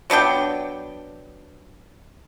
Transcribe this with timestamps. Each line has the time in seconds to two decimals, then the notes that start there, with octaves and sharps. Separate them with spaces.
0.10 F#3 B3 D4 G5